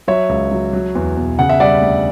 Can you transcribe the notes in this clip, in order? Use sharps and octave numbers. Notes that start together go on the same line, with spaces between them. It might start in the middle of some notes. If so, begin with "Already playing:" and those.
F#3 C#5 E5
C#2
F#3
F#3
E2
B2
C#3 F#5
E5
G3 D5 F#5
D2